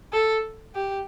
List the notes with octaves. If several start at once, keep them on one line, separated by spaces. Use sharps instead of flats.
A4
G4